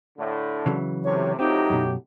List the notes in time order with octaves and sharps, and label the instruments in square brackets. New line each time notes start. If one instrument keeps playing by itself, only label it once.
[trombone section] A2 D3
[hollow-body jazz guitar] C#3 E3 F#3
[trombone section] A2 C3 [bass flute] C#5
[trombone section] A2 F#3 G4 [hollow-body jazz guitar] C4 F4 [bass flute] D#4
[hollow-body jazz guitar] F#2 B2